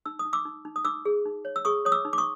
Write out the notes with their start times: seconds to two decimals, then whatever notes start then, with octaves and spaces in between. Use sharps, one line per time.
0.06 D#4 E6
0.19 D#6
0.25 D#4
0.33 D6 E6
0.45 D#4
0.65 D#4
0.76 D#6
0.85 D#4 D6 E6
1.05 G#4
1.25 D#4
1.45 C#5
1.56 E6
1.65 G#4 C#6 D#6
1.85 C#5 D#6
1.92 D6 E6
2.05 D#4
2.13 D6
2.18 C#6 D#6